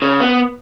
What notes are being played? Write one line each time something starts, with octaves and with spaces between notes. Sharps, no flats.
C#3
B3